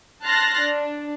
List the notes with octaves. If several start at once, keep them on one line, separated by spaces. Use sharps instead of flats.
A5 C6 F6 F#6 A6 A#6
D4